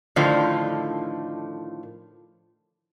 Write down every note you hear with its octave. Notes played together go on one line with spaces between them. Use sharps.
A2 D3 D#3 F3